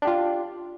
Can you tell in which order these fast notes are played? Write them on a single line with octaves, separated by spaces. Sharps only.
D4 G4 F4